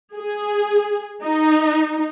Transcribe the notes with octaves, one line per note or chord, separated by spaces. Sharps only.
G#4
D#4